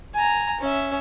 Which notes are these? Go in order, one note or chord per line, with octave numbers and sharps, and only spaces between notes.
G#5 A#5
C#4 E5